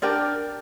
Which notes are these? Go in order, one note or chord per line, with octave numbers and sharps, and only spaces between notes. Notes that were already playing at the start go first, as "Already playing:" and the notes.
D4 G4 A#4 D5